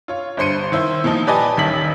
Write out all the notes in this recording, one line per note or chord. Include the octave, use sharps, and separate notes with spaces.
F4 C#5
G1 G2 C5 C6 C#7 D#7
D#3 E4 C5
A#2 E3 F3 D#4
G4 B4 D5 D#5 G#5 A5
D#1 A1 D#3 C#4 B6 F#7